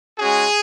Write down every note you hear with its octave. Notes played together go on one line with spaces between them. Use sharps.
G#3 C#4 F#4 G#4